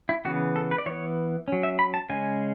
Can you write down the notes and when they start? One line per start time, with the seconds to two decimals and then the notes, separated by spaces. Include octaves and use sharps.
0.09 E4
0.25 C#3 E3 B3 F#4
0.56 A4
0.71 B4
0.78 D5
0.86 E3 B3 C#5
1.48 F#3 C#4
1.63 E5
1.79 B5
1.94 A5
2.09 C#3 G#3 C#4 G#5